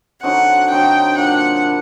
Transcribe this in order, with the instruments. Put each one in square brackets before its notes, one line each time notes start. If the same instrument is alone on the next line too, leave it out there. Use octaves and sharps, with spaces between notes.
[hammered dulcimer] D3 F#3 C4 D#4 [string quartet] F#5
[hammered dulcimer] D3 F#3 C4 D#4 [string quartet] G5
[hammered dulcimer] A#2 G3 D4 [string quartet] F#5
[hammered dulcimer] A#2 G3